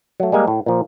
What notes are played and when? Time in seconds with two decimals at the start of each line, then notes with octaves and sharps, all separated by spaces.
0.20 F#3 A3
0.32 G3 G#3 A#3 G#5
0.48 A2
0.66 A#2 F3